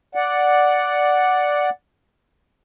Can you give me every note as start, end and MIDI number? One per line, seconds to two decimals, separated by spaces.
0.15 1.70 74
0.15 1.70 78